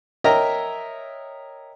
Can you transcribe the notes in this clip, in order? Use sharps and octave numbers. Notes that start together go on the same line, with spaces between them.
A#4 C#5 D#5 E5 G5 A#5